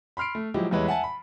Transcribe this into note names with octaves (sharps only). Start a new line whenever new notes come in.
B5 C6 F6 C7 D7
A3
F3 F#3 G#3 E4 G4
E2 G3 G#3 E4 B4 C#5
E5 F#5 G#5 A5
B5